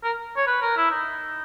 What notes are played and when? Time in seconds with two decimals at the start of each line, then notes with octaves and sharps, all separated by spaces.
0.04 A#4
0.36 C#5
0.47 B4
0.62 A#4
0.77 E4
0.91 D#4